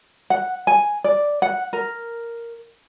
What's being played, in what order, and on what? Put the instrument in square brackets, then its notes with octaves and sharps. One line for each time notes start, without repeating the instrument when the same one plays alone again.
[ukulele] F#5
G#5
D5
F#5
A#4